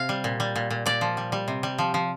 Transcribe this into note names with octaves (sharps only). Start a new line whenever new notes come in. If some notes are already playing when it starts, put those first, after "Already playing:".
Already playing: C3 F5
G3
A#2
G3
A#2
A#2
A#2 D5
F3
G3
G3
C3
G3
F3
F3